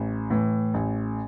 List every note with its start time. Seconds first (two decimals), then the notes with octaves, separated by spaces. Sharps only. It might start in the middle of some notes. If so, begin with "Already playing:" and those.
Already playing: A1
0.30 A2 E3
0.74 A1